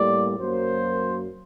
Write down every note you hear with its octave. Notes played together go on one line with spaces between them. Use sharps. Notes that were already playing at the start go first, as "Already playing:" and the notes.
Already playing: A2 G3 A#3 D5
F#2 F#3 A#3 C5